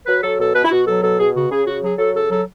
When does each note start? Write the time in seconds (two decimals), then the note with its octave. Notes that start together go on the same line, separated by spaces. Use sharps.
0.07 F#3 B4
0.23 F#3 A4
0.39 B2 A4
0.55 B2 B4
0.65 E4
0.71 B2 F#4
0.87 F#3 A4
1.03 B2 A4
1.19 B2 G#4
1.35 C#3 F#4
1.51 C#3 G#4
1.67 C#3 F#4
1.83 F#3 G#4
1.98 F#3 A4
2.15 C#3 A4
2.31 F#3 A4